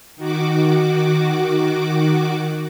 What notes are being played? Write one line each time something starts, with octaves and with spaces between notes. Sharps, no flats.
D#3 F#4 D6